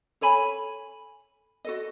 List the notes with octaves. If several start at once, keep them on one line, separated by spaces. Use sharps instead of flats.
A4 C#5 G#5 B5
F#4 A4 D#5